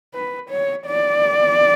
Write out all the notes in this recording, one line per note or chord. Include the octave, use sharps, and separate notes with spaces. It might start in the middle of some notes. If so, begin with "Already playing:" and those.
B4
C#5
D5